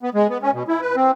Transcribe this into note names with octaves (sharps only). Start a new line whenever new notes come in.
B3
G#3
B3
C#4
B2
E4
B4
C4